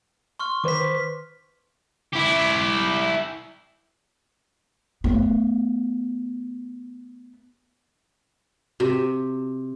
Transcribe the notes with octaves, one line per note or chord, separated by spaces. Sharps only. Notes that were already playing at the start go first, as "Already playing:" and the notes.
C6 C#6 F6
D#3 B4 C5 D6 B6
E4 G4
A3 B3
C3 F#4 G4